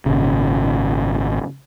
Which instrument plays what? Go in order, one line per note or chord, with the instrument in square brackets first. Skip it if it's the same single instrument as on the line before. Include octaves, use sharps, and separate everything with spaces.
[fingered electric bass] G#1 A#2 C#3